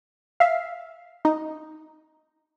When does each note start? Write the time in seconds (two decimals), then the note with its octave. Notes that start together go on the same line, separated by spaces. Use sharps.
0.40 E5 F5
1.25 D#4